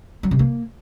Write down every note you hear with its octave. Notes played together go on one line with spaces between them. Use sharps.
F#3
C3
A#3